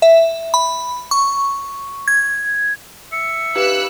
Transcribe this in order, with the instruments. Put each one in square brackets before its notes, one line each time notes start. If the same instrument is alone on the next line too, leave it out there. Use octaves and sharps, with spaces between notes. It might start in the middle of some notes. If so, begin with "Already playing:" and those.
[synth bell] E5
B5
C#6
G#6
[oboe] E5 [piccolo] C#7
[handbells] D#4 G4 F5 [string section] B4 E6 F#6